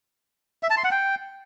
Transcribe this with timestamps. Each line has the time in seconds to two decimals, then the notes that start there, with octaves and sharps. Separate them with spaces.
0.63 E5
0.70 A5
0.77 C6
0.84 F#5
0.91 G5